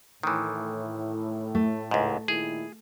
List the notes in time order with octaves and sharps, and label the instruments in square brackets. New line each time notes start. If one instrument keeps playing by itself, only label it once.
[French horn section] A2 [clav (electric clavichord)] D#3 E3
[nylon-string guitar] A3
[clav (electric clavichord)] C#2 G#2
[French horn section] A#2 D#3 E4 [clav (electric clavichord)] G#4